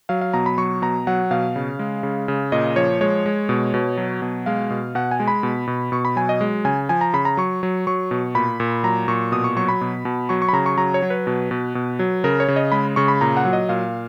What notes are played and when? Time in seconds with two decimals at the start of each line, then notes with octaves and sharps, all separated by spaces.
0.09 F#3 F5
0.21 F5
0.33 B2 A#5
0.46 B5
0.58 F#3 C#6
0.82 B2 A#5
1.07 F#3 F#5
1.31 B2 F5
1.56 C#3
1.79 G#3
2.03 C#3
2.28 C#3
2.52 A#2 D#5
2.76 F3 C#5
3.01 G#3 C#5
3.26 G#3
3.49 B2
3.74 B2
3.97 F#3
4.22 B2
4.46 G#3 F5
4.70 B2
4.95 B2 F#5
5.11 G#5
5.20 G#3
5.28 B5
5.43 B2
5.67 B2
5.92 B2 C#6
6.05 B5
6.16 F#3 G#5
6.29 D#5
6.41 G#3
6.65 C#3 G#5
6.89 F3 G#5
7.01 A#5
7.13 C#3 B5
7.25 A#5
7.37 F#3 C#6
7.63 F#3
7.87 F#3 C#6
8.11 B2
8.35 A#2 B5
8.60 A#2
8.83 F#3 A#5
9.08 A#2 C#6
9.32 B2 D#6
9.44 C#6
9.56 F#3 C#6
9.68 B5
9.81 B2
10.05 B2
10.29 F#3 C#6
10.42 C#6
10.49 B5
10.53 C#3 A#5
10.66 C#6
10.77 F#3 A#5
10.94 C#5
11.02 F#3
11.10 B4
11.27 B2
11.51 B2
11.75 B2
11.99 F#3
12.24 C#3 A#4
12.40 C#5
12.48 C#3
12.56 D#5
12.72 G#3 B5
12.96 C#3 C#6
13.08 B5
13.21 A#2 A#5
13.37 F#5
13.45 F#3
13.53 D#5
13.69 A#2 F5